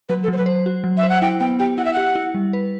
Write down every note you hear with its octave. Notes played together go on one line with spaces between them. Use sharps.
F#3 B4
A4
F#3 C5
B4
C5
F#4
F#3
E5
C5
F#5
E4 G5
B3 G5
G4 G5
E4 F#5
E5
G4 F#5
E4
G3
B4